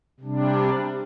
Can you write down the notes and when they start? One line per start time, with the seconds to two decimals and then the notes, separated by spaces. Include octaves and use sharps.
0.20 C3 G3 D4